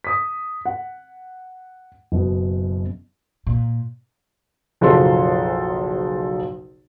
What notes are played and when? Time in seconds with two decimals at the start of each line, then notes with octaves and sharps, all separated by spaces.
0.04 D#6 B6
0.66 F#5
2.12 F#1 B2
3.47 A#2
4.81 F#1 B1 F3 G#4 A4 C6